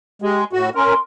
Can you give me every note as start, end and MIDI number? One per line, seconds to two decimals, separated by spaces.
0.22 0.44 56
0.22 0.41 67
0.53 0.70 45
0.53 0.70 66
0.53 0.69 69
0.75 0.94 61
0.75 0.94 70
0.75 0.99 84